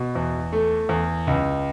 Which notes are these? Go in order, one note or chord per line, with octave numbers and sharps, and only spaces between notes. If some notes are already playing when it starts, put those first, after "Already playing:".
Already playing: B2
E2
A3
E2
C#2